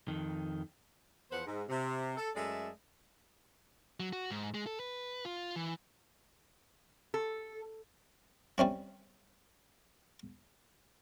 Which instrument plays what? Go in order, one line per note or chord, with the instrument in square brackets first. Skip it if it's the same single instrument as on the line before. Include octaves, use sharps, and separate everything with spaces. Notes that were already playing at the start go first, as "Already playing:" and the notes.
[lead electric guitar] F2 D#3
[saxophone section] E2 F3 B3 B4 C5 F#5
G#2
C3
A4
F#2 G#3 A3 A4 D5 E5
[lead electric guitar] F#3
F#4
G#2
G#3
A4
B4
F4
E3
[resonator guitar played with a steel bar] A4
[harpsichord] G3 C4 C#4 E4